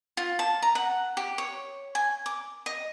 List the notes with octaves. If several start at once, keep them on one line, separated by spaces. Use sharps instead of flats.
F4
A5
A#5
F#5
G4
C#5
G#5
D6
D#5